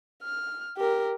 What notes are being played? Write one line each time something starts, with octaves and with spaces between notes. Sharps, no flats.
F6
G4 A#4